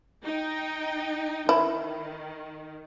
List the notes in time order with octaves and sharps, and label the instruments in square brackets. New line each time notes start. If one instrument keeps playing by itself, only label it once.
[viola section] D#4 G5
[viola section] D#3 [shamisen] E4